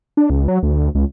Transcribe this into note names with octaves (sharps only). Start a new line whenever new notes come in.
D4
C#2
F#3
D2
C#2